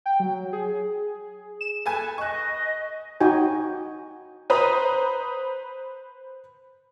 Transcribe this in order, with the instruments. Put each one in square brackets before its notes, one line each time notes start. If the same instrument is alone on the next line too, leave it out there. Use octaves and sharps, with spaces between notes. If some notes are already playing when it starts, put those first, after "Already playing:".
[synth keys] G5
F#3
G#4
E7
[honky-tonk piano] A4 B4 G#5
[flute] D#5 [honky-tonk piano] C#6 F#6
[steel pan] D#4 F#4 G5 G#5
[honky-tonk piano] B4 C5 A#5 D#6